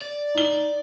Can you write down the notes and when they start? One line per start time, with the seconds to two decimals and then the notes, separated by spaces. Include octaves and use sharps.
0.02 D5
0.35 D#4 G7